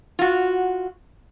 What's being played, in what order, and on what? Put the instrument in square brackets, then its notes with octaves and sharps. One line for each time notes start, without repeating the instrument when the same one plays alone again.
[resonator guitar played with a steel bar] F4 F#4